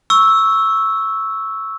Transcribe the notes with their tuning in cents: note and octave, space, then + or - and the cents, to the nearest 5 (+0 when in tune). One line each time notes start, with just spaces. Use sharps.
C#6 +0 E6 -5